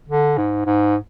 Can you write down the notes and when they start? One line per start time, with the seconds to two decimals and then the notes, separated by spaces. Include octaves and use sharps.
0.08 D3
0.38 G#2
0.66 G#2